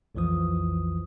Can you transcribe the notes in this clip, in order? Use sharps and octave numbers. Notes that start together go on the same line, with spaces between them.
B1 F2 E3 F3 D#6